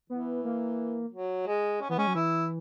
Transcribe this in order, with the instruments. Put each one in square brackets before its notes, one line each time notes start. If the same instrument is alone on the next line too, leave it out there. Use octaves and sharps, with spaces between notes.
[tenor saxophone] E3 [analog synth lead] B3
[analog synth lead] A#3
[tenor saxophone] F#3
G#3
C#4
[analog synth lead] E3 [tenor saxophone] B3
[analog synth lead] G#3 [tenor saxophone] C#4
[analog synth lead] F#3
[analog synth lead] E3 [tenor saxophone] E4